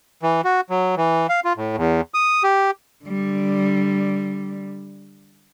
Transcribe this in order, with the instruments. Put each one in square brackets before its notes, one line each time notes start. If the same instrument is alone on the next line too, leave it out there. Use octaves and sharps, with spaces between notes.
[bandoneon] E3
F#4
F#3
E3
F5
F4
A2
E2
D#6
G4
[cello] D3 G3